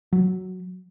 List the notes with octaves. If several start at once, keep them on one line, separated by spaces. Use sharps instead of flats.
F#3